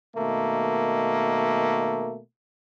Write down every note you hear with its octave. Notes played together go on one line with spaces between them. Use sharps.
B2 D#3 A3 A#3